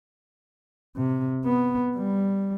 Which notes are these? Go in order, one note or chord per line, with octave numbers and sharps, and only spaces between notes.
C3
B3
G3